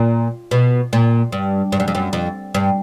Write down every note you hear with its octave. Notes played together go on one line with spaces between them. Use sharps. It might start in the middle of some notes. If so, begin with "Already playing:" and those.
Already playing: A#2
B2
A#2
G2
G2
F#2
F2
F#2
F2
G2